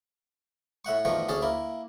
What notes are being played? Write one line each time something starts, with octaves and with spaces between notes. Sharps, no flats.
A2 E5 F#5 C#6
E2 D#3 F3 A3 C#6
D2 C#4 G#4 A5
A#3 E4